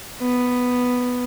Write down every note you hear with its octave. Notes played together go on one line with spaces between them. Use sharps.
B3